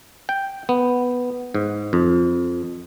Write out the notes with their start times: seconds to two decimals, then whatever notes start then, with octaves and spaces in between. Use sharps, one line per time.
0.29 G5
0.69 B3
1.54 G#2
1.93 F2